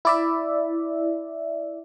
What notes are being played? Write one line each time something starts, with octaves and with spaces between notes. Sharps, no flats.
E4 D5 E5